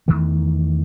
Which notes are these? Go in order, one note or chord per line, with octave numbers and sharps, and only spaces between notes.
E2 D#3 E3 A3